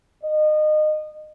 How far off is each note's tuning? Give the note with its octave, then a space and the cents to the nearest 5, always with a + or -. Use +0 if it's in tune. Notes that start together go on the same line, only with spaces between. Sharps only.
D#5 -25